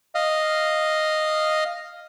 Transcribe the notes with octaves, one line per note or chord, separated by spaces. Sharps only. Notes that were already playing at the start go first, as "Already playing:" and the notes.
D#5 F5